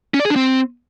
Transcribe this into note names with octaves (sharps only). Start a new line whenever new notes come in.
C#4
D5
G#4
D4
C4